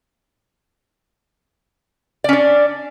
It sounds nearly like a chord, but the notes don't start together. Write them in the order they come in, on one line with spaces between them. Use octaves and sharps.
D5 C#4 D4